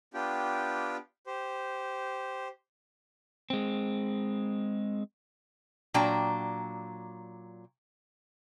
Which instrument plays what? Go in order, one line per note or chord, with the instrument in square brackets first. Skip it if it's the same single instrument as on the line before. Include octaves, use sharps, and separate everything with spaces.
[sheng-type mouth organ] B3 D4 F4 G4 G5
G4 C5
[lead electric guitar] G#3 C4
[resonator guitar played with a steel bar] A#2 F#3 D4 G5 A#5